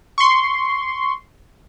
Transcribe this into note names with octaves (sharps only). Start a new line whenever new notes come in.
C6 C#6